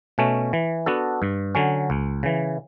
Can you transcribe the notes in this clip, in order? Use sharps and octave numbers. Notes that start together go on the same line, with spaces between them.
B2 A3 C#4
E3
B3 D4 F#4 A4
G2
D3 F#3 C#4
C#2
C#3 E3